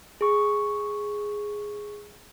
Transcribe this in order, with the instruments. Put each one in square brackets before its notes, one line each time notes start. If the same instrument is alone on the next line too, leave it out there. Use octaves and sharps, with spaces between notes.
[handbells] G#4 C#6